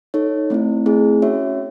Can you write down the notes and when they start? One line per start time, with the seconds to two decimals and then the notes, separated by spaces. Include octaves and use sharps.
0.14 D#4 A4 C#5
0.50 A3 C4 E4
0.86 A3 C4 E4 G#4
1.22 C#4 F#4 C#5 E5